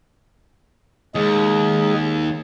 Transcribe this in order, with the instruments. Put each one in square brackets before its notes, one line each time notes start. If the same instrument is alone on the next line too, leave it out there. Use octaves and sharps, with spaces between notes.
[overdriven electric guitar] D#2 [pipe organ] G#3 G#4